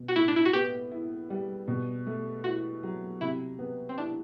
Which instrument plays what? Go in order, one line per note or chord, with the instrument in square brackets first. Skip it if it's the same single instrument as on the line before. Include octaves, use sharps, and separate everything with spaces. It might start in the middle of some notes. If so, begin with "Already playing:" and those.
Already playing: [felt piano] B2
[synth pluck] F#4
[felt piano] A2 [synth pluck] E4
[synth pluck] D4
E4
F#4
[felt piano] B3 [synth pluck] G4
[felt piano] E4
G3
B2
A3
[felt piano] E4 [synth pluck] F#4
[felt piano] F#3
[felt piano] C3 [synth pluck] E4
[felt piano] B3
[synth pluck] C4
[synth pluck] D4 [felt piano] E4